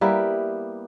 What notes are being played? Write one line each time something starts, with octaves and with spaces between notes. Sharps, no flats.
G3 A#3 B3 E4